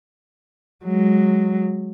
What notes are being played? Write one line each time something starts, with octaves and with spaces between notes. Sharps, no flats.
F#3 G#3